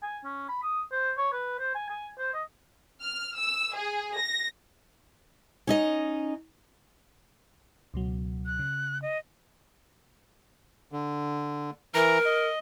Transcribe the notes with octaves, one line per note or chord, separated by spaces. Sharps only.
G#5
C#4
B5
D#6
C5
C#5
B4
C5
G#5
G#5
C5
D#5
F6
E6
G#4
A#6
C#4 D#4 D#5
C#2 B2 F#3
F#6
C#3
D#5
D3
E3 A#4 A#5
D#5